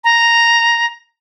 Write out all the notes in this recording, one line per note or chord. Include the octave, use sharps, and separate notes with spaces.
A#5